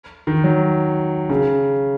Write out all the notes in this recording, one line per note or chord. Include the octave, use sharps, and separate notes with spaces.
D#3
F#3
C#3